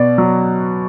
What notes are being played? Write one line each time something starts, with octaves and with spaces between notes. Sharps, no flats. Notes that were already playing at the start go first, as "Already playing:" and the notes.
Already playing: B2 D5
F#3